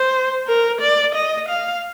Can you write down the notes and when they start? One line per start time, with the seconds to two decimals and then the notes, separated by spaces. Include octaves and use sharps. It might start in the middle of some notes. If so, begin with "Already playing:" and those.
Already playing: C5
0.48 A#4
0.81 D5
1.15 D#5
1.49 F5